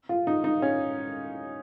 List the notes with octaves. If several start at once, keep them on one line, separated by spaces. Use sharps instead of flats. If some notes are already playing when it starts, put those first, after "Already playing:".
F4
D#4
D#4
C#4